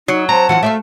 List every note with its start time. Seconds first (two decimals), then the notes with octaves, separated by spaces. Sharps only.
0.08 F#3 D#4
0.29 C4 A5 A#5
0.49 E3 F4 F#4 F#5
0.63 A3 D5 E5 F5